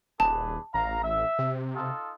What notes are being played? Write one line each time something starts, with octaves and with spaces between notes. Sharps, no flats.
D#1 D4 G#4 B4 A5
A1 F5 A#5
E5
C3
D#4 F4 A4